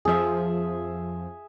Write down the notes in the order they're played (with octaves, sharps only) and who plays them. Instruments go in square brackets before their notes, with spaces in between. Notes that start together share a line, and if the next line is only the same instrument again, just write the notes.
[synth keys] F2 F3 [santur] G#4 E5